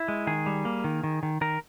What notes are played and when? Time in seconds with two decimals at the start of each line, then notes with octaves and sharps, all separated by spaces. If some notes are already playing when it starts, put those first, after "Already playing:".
Already playing: E4
0.08 G#3
0.27 D#3 G#4
0.46 G3
0.65 A#3
0.84 D#3
1.04 D#3
1.23 D#3
1.41 D#3 A#4